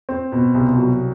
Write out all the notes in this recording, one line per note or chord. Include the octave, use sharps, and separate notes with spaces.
C4
B2
C2
F#3